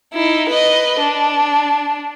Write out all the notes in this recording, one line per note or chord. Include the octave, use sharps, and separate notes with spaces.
D#4 E4
B4 D#5
D4